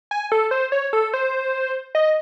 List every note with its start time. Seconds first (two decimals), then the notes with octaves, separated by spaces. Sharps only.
0.11 G#5
0.32 A4
0.51 C5
0.72 C#5
0.93 A4
1.14 C5
1.95 D#5